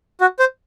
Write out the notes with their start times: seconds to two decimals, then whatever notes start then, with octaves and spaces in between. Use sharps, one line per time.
0.21 F#4
0.39 C5